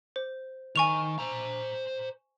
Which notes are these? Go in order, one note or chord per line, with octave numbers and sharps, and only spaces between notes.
C5
D#3 G#5 C#6 F7
C5 A#5